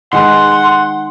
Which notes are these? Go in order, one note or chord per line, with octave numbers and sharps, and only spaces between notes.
D#3 G#3 B4 F#5 C6